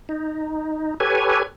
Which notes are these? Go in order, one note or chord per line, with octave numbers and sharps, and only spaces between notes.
D#4
G4 A4 B4 C#5 G#5